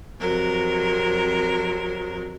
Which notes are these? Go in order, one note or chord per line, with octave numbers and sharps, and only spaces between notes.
F2 C3 F#3 A#4